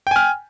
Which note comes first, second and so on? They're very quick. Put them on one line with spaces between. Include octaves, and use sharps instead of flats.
G5 G#5 F6